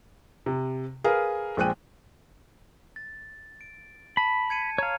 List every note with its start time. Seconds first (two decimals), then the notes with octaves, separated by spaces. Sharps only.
0.46 C3
1.04 G#4 A#4 B4 F5
1.57 A#1 G#3 C5 G5 F#6 D#7
2.96 A6
3.61 D7
4.17 A5 B5
4.50 G#6 C#7 D#7
4.78 C#5 F5 A#5